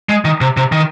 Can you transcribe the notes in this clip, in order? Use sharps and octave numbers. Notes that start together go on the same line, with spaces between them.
G#3
D#3
C3
C3
D#3